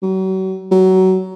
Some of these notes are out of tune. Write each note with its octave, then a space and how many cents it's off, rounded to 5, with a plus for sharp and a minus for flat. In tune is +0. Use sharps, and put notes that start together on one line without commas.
F#3 +35
F#3 +20